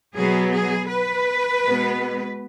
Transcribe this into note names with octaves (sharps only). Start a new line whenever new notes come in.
B2 F#3 B3 G#4
G#4
B4
B2 G#3 B3